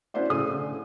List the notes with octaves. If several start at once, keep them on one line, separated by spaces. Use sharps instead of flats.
C#4 D4 E4 F#4 C5 D5
A2 C#3 A4 G#5 D#6
D3